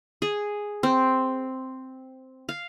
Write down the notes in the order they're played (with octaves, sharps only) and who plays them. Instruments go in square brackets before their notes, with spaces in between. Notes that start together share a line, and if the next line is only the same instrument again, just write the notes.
[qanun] G#4
C4
F5